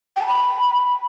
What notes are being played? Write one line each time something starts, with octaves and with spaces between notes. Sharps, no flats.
G5
A5
B5